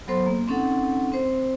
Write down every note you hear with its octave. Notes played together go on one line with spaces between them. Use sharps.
F#3 B3 A4 C5 C6
A#3
C4 C#4 D#4 A4 F#5
C4 C5